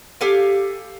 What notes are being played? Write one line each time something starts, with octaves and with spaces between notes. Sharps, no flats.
G4 A4 F5 G#5